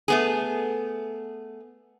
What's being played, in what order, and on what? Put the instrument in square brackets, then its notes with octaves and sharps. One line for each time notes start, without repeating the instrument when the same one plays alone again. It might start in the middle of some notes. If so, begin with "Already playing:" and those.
[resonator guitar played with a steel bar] A3 B3 G#4